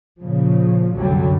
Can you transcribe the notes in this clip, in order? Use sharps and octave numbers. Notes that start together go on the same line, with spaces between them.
A#2 C#3 F3
C2 F#2 D3 F#3 G3